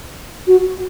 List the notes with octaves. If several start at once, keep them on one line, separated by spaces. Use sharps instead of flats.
F#4